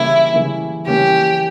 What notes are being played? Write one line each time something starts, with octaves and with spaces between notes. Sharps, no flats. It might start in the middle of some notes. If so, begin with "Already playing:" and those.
Already playing: C#3 E3 G3 A#3 C#4 E4
C#3 E3 G3 A#3 C#4
C#3 E3 G3 A#3 C#4 G4